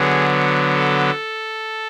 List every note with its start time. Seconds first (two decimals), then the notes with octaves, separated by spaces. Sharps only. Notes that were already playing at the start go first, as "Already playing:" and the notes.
Already playing: D3 F#3 B3 G#4
0.75 A4